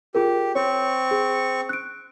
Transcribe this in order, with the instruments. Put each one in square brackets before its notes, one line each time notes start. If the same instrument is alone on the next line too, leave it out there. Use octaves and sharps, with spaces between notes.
[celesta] F4 G#4 A#4 [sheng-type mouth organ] G4
[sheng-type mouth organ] C4 C#6 [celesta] C#5
[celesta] G#4
F#6 D7